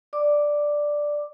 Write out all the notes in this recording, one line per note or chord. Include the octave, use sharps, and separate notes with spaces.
D5 D6